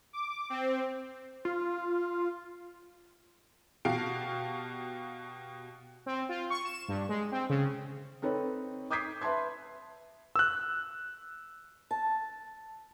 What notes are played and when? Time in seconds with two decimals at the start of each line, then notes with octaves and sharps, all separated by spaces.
0.13 D6
0.50 C4
1.45 F4
3.85 B2 F#4 G4 F5 A5 D7
6.06 C4
6.29 F4
6.50 C#6
6.65 E7
6.88 G2
7.09 G#3
7.32 C4
7.50 C#3
8.22 C4 D#4 A4 B4 C#5
8.91 D6 D#6 G6 G#6 B6 C7
9.22 B4 E5 A5 C6 G#6
10.36 E6 F#6
11.91 A5